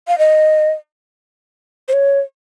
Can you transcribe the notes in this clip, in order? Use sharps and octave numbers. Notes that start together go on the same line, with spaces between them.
F5
D#5
C5
C#5